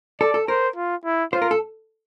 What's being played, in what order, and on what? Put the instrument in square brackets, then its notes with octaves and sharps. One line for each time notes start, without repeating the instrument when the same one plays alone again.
[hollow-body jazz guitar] A4 [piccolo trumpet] D5
[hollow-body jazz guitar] A4
[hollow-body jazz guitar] A#4 [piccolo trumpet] C5
[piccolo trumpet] F4
E4
[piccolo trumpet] F4 [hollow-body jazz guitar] C5
[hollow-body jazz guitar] A#4
A4